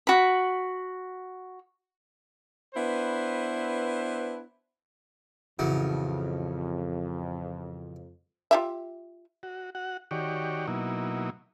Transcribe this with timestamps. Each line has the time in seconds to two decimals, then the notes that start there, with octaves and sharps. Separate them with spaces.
0.07 F#4 B5
2.75 B3 D4 E4 B4 C5
5.59 A1 F2 C#3 F#3
8.51 F4 G4 E5
9.43 F#4
9.75 F#4 F#5
10.11 D#3 F#4 G4 C#5 D5
10.67 B2 F#3 A#3 D#4 E4